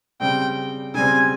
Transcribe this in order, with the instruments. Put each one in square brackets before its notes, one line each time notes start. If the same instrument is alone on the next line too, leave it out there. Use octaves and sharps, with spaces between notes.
[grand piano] C#3 G3 C4 [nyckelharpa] G5
[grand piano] C#3 G3 C4 [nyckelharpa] G#5